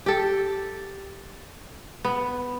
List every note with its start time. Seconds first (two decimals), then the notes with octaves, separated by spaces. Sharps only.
0.06 G4 A4
2.05 B3